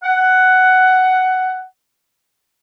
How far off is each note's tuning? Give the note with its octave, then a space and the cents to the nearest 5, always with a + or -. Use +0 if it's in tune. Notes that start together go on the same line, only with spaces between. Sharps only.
F#5 +10